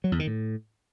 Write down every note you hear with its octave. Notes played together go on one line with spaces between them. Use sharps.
F#3
E2
D#3
A2